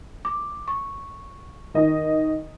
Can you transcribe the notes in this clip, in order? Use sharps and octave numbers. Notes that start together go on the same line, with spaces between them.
D6
C#6
D#3 D#5